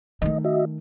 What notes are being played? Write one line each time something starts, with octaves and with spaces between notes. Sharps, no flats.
D#3 A3 D#5
F#4 D#5 E5